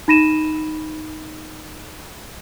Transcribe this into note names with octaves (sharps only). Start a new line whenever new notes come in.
D#4 B5 A#6 D#7 E7